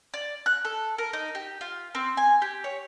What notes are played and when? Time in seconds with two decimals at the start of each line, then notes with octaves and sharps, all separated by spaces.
0.14 D5
0.46 F#6
0.65 A4
0.98 A#4
1.13 D#4
1.35 G4
1.61 F4
1.95 C4
2.17 G#5
2.42 G4
2.64 C#5